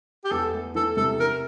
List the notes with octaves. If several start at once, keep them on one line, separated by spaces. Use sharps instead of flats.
G4
E2 A4
A3
E3 A4
C3 A4
E3 A#4